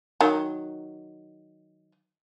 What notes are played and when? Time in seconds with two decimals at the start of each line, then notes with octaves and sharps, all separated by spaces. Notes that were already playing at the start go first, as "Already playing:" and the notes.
0.21 D#3 F#3